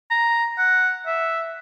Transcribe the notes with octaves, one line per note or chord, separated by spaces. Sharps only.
A#5
F#5
E5